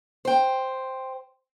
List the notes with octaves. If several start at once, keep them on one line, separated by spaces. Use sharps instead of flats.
C5 G5